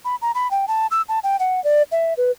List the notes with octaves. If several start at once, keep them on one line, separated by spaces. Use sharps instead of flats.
B5
A#5
B5
G5
A5
E6
A5
G5
F#5
D5
E5
B4